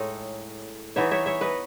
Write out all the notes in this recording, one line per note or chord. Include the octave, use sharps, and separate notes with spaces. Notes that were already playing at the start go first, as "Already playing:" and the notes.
Already playing: A2 G#3 D#4 A4 C#5
E3 B3 D#4 C#5 E5
C#5 E5
C#5 E5
B4 D#5